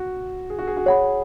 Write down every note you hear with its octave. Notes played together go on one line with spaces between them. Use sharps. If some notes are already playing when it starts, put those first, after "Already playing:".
Already playing: F#4
G#4
F#4
G#4
F#4
G#4 C#5 F#5 B5